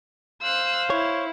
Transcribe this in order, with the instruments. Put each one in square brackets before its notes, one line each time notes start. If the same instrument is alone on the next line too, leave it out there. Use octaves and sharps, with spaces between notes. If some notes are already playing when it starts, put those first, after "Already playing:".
[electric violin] C5 F5 [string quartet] E6 F#6
[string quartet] E4 [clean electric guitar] C#5